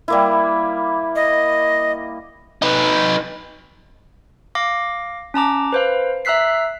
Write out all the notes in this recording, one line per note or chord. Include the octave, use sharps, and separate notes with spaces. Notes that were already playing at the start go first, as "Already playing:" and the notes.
G3 A#3 E4
D#5
D#4 B4
F5 D6 A#6
C#4 A5 A#5 D6
B4 C5 F5
E5 A#5 E6 F#6 B6 C7